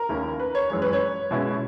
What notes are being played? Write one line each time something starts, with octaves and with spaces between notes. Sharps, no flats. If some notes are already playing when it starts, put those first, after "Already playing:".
Already playing: A#4
D#2 D#3 A#3 C#4 E4
B4
C#5
F#2 E3 G#3 C#5
B4
C#5
B2 G#3 C#4 E4